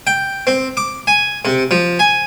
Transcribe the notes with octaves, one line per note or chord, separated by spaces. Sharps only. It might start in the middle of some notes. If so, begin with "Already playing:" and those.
G5
C4
D6
G#5
C3
F3
G#5